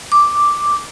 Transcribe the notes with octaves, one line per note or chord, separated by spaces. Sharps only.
D6